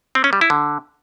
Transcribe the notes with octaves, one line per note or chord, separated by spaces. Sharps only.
C4
C#4
G3
E4
D3